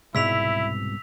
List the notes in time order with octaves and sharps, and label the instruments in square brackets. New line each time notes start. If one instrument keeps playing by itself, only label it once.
[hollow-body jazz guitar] C2 G#2 B2 [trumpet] E4 [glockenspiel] E6 B6 F7